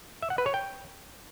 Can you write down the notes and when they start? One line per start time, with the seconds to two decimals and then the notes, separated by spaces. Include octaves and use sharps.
0.22 E5
0.30 F#5
0.38 B4
0.46 C#5
0.54 G5